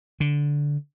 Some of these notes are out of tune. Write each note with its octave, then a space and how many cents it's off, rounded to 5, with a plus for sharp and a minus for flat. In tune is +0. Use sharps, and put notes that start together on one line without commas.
D3 -10